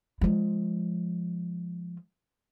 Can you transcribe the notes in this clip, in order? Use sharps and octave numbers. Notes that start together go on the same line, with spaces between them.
F3 G#3